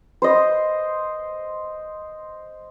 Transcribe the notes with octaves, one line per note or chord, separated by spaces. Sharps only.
C5 D#5